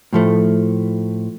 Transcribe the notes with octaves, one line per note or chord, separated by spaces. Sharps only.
A2 F3 A3